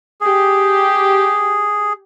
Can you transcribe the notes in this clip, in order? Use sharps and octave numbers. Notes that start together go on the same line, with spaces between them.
G4 G#4